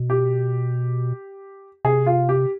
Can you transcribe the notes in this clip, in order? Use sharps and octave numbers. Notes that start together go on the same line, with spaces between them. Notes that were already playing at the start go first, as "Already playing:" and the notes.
Already playing: B2
G4
C3 G#4
F4
G4